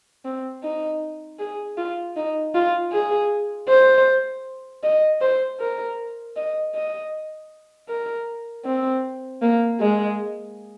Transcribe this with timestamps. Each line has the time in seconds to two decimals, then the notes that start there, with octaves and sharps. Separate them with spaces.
0.25 C4
0.63 D#4
1.39 G#4
1.77 F4
2.16 D#4
2.54 F4
2.92 G#4
3.69 C5
4.83 D#5
5.21 C5
5.60 A#4
6.36 D#5
6.75 D#5
7.89 A#4
8.65 C4
9.42 A#3
9.80 G#3